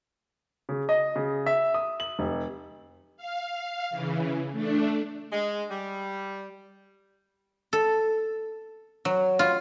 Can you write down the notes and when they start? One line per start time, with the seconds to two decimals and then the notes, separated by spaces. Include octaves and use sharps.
0.69 C#3
0.89 D#5
1.16 C#3
1.46 E5
1.74 D#6
2.00 F#7
2.19 F1
3.17 F5
3.90 C#3 E3
4.52 A3 D4
5.32 G#3
5.71 G3
7.73 A4
9.05 F#3
9.39 F4